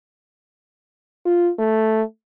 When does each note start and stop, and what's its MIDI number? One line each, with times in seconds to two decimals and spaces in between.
1.25 1.50 65
1.58 2.02 57